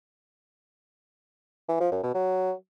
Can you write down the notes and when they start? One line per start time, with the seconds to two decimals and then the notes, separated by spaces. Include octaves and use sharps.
1.69 E3
1.80 F3
1.92 F#2
2.03 B2
2.15 F#3